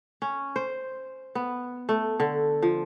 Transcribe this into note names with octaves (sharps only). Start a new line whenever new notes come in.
C#4
C5
B3
A3
D3
F3